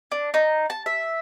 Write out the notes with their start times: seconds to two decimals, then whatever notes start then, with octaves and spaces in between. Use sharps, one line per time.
0.12 D4
0.34 D#4
0.70 A5
0.86 E5